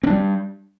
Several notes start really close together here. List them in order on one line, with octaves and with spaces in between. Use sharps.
C4 D4 G3